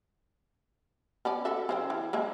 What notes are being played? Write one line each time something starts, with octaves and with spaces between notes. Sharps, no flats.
B3 C#4 D5
F#4 A4 E5
C#3 C5 G5
E3
G#3 A#3 E5